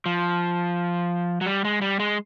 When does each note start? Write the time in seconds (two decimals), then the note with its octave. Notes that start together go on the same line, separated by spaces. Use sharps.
0.06 F3
1.41 F#3
1.46 G3
1.65 G#3
1.82 G3
1.99 G#3